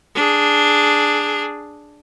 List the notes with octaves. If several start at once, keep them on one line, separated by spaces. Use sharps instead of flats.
D4 G#4